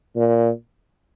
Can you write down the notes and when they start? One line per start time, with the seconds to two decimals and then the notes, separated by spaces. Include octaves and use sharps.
0.16 A#2